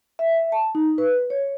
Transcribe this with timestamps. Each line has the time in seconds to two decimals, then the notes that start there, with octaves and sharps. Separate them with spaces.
0.19 E5
0.52 A5
0.75 D#4
0.98 B4
1.30 C#5